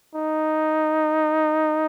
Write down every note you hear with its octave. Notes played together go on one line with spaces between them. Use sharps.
D#4